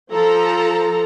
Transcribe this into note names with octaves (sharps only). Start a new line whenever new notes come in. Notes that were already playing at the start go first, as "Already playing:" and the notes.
F3 A4 A#5